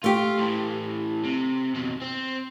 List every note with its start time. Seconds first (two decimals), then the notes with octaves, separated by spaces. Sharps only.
0.04 A3 F4 G4
0.39 A2 E3
1.24 C3
1.75 F2 B2
2.02 C4